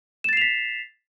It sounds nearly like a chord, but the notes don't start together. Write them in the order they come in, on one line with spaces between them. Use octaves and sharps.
E7 A6 C7 F7 B6